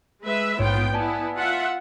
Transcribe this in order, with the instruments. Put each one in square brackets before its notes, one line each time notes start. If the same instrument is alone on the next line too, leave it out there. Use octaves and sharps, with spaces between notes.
[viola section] G#3 B4 E5
[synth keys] A#1 G#2 C#5 [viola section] B3 F4 G5
[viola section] B3 E4 [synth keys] D5 G#5 A5
[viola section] F4 E5 F#5